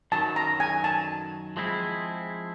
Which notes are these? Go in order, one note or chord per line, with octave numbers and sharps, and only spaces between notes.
F#2 D#3 F#3 A5
A#5
G#5
A5
F3 G#3 C4 E4 G#4